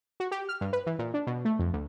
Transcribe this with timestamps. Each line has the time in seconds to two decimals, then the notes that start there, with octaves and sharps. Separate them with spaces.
0.20 F#4
0.31 G4
0.49 F6
0.61 G2
0.73 B4
0.86 E3
0.99 A#2
1.14 D4
1.27 B2
1.45 A3
1.59 F2
1.73 D2